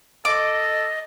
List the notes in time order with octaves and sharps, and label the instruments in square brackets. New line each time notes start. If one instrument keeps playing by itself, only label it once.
[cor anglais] A4 [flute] D#5 [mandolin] D6